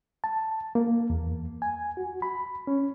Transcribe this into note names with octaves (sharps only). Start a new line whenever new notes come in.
A5
A#3
E2
G#5
F#4
B5
C#4